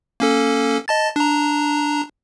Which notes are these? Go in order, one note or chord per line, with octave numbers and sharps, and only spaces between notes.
A#3 C#4 A4
D#5 A5 A6
D4 A#5